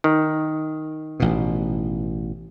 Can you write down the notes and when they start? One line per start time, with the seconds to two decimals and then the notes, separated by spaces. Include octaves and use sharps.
0.04 D#3
1.20 A1 B2